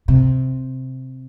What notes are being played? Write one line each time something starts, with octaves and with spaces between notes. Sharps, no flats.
C3